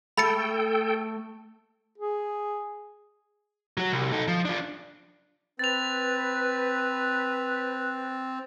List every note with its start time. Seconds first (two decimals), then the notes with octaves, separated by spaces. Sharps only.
0.17 A3 A4 G5 B5 A6 C#7
1.98 G#4
3.77 F#3 F#4
3.92 C2
4.12 D#4 A4
4.28 F3
4.45 D4 F4
5.59 C4 B4 A6 F7